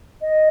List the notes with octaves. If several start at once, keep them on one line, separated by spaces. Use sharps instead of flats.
D#5